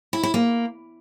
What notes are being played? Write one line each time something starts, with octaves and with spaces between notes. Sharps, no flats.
E4
E4
A#3